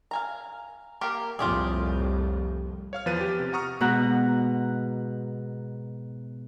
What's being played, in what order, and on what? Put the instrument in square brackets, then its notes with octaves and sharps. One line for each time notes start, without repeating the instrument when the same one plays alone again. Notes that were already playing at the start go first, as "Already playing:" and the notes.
[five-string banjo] F5 G#5 A#5
A#3 G4 A#4
[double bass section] C2 F2 A2 [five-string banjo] F4 G4 G#4
[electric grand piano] C#5 F5 F6
E2 F3 B4 A6 D#7
G4
C3
F#5 A#5 C#6 D#6 F6
[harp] G#2 B2 F#4 F#5 A#5